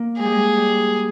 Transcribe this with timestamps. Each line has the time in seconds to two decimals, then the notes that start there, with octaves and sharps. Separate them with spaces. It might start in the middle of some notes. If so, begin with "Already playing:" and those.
Already playing: A#3
0.18 G#3 G#4
0.25 G3
0.32 G#3
0.56 G3